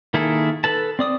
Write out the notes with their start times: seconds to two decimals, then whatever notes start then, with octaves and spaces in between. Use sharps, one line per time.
0.14 D#3 A#3 E4 G#4 A4
0.64 A4 B4 A5
0.99 C4 D5 D#6